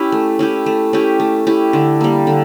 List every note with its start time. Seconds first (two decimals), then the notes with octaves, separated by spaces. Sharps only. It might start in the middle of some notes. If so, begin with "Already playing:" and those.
Already playing: C#4 E4 G4
0.12 A3
0.39 C#4 E4 G4
0.66 A3
0.93 C#4 E4 G4
1.20 A3
1.47 C#4 E4 G4
1.73 D3
2.01 G3 A#3
2.27 D3